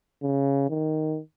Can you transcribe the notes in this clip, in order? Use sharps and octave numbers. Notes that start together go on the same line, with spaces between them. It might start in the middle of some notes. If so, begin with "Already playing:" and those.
C#3
D#3